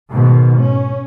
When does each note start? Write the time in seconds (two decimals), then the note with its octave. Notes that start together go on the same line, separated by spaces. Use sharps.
0.11 G#2 B2 D#3
0.58 C#4